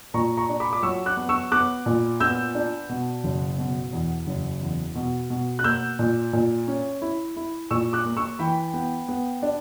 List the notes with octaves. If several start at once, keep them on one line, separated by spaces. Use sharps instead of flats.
A#2 A#5 C#6
A#5 C#6
D4
B5 D6
D6
F#3 C#6 E6
D6 F#6
B3
C#6 E6
B3 D6 F#6
A#2
B3 E6 G6
D4
B2
F#1
B2
E2
F#1
E2
B2
B2
F#6
A#3 E6 G6
A#2
A#2
C#4
E4
E4
A#2 C#6 E6
D6 F#6
A#3
C#6 E6
E3 G5 B5
B3
B3
D4